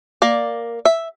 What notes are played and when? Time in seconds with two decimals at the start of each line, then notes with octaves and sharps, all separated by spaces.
0.22 A#3 D5
0.85 E5